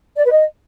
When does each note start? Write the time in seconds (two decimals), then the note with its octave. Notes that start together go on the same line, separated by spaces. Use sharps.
0.17 D5
0.24 B4
0.31 D#5